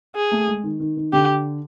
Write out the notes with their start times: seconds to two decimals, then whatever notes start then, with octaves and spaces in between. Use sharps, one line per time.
0.16 G#4
0.31 A3
0.48 G#3
0.64 D#3
0.80 D#3
0.97 D#3
1.13 D3 G4